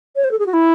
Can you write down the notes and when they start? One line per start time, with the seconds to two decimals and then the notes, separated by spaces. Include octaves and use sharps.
0.16 C#5
0.24 C5
0.31 A4
0.39 G#4
0.46 F#4
0.53 E4